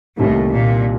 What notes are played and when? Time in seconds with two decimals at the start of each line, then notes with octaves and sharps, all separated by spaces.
0.17 C2 A2 C3 D#3 G3 A#3
0.50 A#2